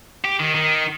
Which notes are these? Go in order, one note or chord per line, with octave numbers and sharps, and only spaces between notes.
G4
D#3
D#3